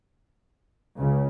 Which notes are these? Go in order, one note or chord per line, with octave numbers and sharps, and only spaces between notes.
C#2 C#3